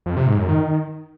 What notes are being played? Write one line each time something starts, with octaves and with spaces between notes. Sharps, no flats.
F2
C3
G#2
F#2
D#3